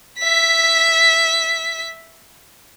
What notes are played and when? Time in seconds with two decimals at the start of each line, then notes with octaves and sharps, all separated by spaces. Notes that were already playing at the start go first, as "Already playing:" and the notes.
0.19 E5 B6